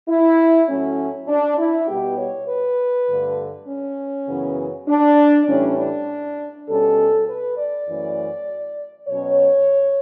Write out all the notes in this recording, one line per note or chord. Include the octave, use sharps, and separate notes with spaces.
E4
A2 F#3 A3 C#4
D4
E4
B2 G3 B3 G4
C#5
B4
G2 D3 A3
C#4
F#2 C#3 E3 B3
D4
A2 E3 G3 C#4
D4
B2 G3 C#4 A4
B4
D5
F#2 E3 A3 C#4
B2 F#3 C#4 C#5